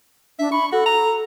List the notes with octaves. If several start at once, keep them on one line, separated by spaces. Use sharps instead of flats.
D4 E5
B5 C#6
F#4 A4
A#5